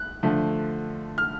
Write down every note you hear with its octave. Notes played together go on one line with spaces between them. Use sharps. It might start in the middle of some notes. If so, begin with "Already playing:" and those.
Already playing: F#6
D3 F3 A3
F6